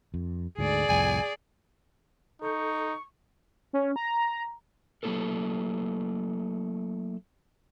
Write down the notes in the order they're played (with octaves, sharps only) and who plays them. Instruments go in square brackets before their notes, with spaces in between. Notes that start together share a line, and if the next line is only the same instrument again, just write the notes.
[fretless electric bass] F2
[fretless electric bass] D2 G#2 D3 [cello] G#4 D5
[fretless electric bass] C2 F2 A2 [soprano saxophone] G#5
[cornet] D#4 [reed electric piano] A4 G6 [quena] C#6
[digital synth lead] C#4
A#5
[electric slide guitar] F#3 A3 A#3 E4 A4 A#4